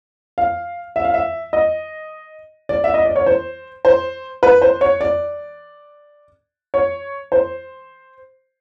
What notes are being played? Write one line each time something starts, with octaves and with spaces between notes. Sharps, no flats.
F5
E5
F5
E5
D#5
D5
E5
D#5
D5
C#5
C5
C5
B4
C5
C#5
D5
C#5
C5